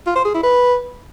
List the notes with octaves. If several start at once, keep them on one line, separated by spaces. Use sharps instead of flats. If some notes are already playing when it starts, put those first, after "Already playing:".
F4
C5
G#4
E4
B4